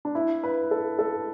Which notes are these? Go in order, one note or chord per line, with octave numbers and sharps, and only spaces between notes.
D4
E4
B4
A4
A4